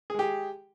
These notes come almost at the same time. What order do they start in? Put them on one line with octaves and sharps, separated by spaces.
G#4 G#3 G4